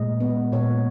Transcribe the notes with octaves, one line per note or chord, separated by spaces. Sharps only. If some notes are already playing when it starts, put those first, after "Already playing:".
Already playing: A#2 G#3 D#5
B3
A#2 C#5